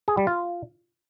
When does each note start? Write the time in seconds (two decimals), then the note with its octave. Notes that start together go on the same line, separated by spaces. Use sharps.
0.08 G#4
0.17 G3
0.27 F4